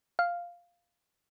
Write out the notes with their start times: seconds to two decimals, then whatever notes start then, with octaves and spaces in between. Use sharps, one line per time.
0.19 F5